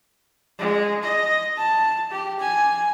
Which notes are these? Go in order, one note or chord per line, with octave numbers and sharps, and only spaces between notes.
G#3
D#5
A5
G4
G#5